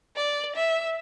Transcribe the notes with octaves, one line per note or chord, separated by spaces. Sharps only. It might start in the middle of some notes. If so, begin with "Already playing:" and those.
D5
E5